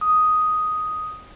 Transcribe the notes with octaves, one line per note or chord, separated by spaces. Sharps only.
D#6